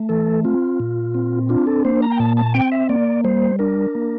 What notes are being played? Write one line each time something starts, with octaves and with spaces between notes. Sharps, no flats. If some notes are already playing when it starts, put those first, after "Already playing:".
Already playing: A3
E3 A4
C4 F4
A#2
C4
D4 F4
A4
A#3 C5
A#5
G5
A#2 A5
A5
C4 G5
E5
A#3 D5
G3 C5
D4 A#4
A#3